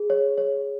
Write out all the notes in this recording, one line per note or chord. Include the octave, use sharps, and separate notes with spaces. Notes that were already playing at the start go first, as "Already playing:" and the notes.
Already playing: G#4
C#5
C#5